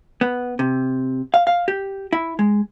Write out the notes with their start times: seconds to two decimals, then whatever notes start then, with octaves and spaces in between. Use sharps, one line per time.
0.21 B3
0.59 C3
1.34 F5
1.47 F5
1.68 G4
2.13 E4
2.39 G#3